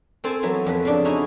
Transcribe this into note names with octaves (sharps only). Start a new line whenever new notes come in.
C4 A4 C5 G#5 A5
E3 F#3 B3
F2 B4
C#3 D4
D#4 E4 F#4 G#5